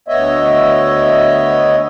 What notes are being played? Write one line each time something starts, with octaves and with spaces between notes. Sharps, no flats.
D2 B3 C#5 D#5 E5